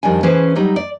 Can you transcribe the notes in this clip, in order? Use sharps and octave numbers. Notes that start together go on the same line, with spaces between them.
F2 D#3 G3 D4 G#5
E3 C#4 G#4 B4 C5
F#3 G3 D#4
D5